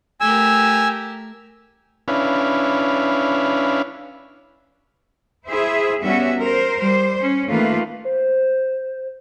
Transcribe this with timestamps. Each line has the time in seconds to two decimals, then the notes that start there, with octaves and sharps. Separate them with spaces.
0.21 A3 G4 A#4 G#5 E6
2.08 C#4 D4 E4 B4 F5
5.49 E4 G#4 C5 E5
6.03 G3 B3 C#4 F#4 E5
6.41 A#4 C5
6.80 G3 C5
7.22 C#4
7.51 D#3 A3 A#3 F4 B4
8.05 C5